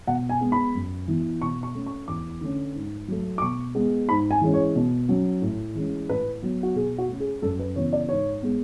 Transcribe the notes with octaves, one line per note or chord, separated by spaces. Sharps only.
B2 F#5
G#5
G#3 B3
B5
F#2
E3 B3
B2 C#6
C#6
A3 C#4
C#6
E2 D6
D3 A3 C#4
G#2
F#3 A3
D6
B2 C#6
G#3 B3
G#2 B5
G#5
E3 G#3 C#4
C#5
B2
F#3 C#4
A2
E3 G#3 C#4
A2 B4
F#3 B3
F#4
B2 G#4
F#4
A3 C#4
G#4
F#2 A4
B4
C#3 E3 B3 C#5
D5
G#2 C#5
G#3 B3